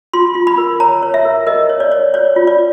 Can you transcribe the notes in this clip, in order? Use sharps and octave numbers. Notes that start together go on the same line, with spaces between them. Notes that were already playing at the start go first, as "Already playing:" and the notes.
F4 C6
F4
B5
A#4
C#5 A#5
C#5
E5
A#4
A#4 D#5
C#5
D5
C#5
C#5 D5
F4
D5